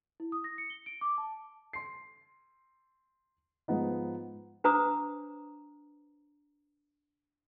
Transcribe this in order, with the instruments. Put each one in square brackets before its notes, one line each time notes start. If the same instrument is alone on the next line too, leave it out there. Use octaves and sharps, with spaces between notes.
[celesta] E4
D#6
A#6
C#7
G7
D7
D6
A5
[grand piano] C6 C7
G#2 F3 B3 D#4
[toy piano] D4 B4 C5 A#5 D6 D#6